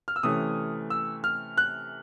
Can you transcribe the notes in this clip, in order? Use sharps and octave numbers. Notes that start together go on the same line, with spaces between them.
F6
E6
C3 E3 A3 C#4 D#6
E6
F6
F#6